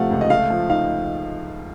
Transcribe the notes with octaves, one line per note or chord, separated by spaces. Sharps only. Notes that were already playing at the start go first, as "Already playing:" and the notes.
Already playing: C3 F3 A3 F5 F#5
C#2
D#5
A3 F5
F3
D#4 F5